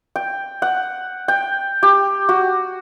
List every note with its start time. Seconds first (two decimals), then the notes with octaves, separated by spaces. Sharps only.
0.16 G5
0.62 F#5
1.28 G5
1.83 G4
2.29 F#4